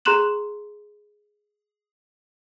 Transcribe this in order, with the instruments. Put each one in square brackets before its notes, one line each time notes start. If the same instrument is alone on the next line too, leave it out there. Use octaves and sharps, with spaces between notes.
[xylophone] G#4 A#5 C6 F#6 E7 F#7